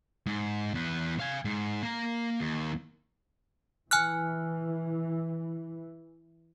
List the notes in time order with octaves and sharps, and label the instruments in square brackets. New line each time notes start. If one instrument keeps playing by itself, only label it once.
[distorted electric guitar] G#2
E2 B4
F5 G#5
G#2
A#3 A#5
D#2
[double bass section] E3 [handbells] G#5 F6 F#6